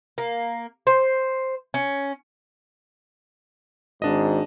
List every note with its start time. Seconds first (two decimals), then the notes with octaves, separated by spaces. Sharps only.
0.18 A#3
0.87 C5
1.74 C#4
4.02 G#1 G#2 D4 D#5